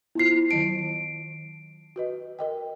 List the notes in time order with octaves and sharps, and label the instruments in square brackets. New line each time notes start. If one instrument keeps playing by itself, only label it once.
[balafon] B3 F4 C5 [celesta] E4 C7
[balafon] D#3 F#3 A5 [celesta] D7
[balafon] F#4 B4 D#5
A#4 D#5 G5